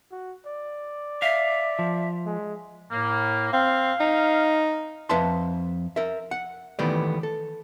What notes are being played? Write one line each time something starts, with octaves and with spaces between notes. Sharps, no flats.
F#4
D5
E5 F5
F3
G#3
A2 A#3
C4 F5
D#4
F2 B4 E5 F#5 A5 C6
A#4 E5
F#5
D#3 E3 A3 B3 G4 D5
A4